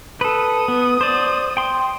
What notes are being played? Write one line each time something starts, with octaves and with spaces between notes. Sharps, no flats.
A4 B4 D#6
B3
C5 D5
G5 C6